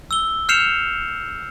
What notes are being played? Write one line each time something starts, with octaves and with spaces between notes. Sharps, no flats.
E6 G7
F6 G6 C7 C#7 E7 F7